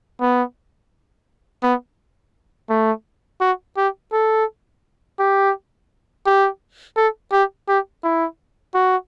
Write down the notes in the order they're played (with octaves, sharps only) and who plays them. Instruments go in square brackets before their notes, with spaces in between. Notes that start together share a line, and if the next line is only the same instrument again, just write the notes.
[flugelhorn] B3
B3
A3
F#4
G4
A4
G4
G4
A4
G4
G4
E4
F#4